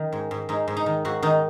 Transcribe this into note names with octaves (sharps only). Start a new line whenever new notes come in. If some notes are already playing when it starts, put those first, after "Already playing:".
Already playing: D#3 C#4
G#2
G#2
G#2 D#4
G#2
D#4
D#3
G#2 F#4
D#3 D#4